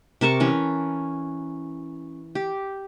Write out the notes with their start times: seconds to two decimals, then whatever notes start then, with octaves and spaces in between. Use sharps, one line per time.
0.21 C3 A#4 A5 C#6
0.40 E3 C#4
2.35 G4